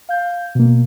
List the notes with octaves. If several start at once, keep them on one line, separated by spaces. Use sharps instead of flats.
F5 G6
B2 A#3